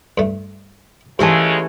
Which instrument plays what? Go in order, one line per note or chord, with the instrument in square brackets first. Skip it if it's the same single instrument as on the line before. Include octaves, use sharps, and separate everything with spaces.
[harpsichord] G2 A3
[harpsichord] G#2 [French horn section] C#3 G#3 [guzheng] E3 A3 C#4 [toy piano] G4 A5